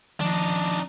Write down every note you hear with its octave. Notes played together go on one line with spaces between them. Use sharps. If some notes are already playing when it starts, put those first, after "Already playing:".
D#3 F3 D4 D#4